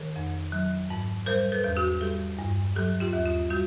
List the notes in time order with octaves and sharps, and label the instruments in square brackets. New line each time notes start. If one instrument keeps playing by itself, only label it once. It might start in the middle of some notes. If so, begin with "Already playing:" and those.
Already playing: [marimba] D#3 G#4 A#4
F2
F#3
G#2
G3 A#4 C5
A4 B4
E2
F#4 G#4
G3 G4 A4
G2
F#3 G4 A4
F4 G4
D#2
F4
G3 F#4